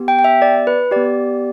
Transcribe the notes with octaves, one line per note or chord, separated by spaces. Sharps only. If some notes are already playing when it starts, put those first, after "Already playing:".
Already playing: B3 G4
G5
G5
E5
D5
B4
B3 G4 D5